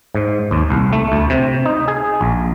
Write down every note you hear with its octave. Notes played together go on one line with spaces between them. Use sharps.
G#2
D#2
C2
A3
D2
C3
D#4
G#4
A#1